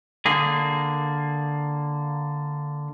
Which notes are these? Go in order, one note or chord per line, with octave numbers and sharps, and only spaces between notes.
D3 A#3 G#4